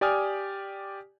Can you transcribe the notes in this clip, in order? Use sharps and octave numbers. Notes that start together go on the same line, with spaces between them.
G4 D5 G5 G#5 D#6 F6